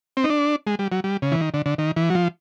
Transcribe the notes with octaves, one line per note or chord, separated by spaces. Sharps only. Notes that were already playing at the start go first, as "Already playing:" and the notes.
C4
D#4
D4
G#3
G3
F#3
G3
C#3
E3
D#3
D3
D3
D#3
E3
F#3
F3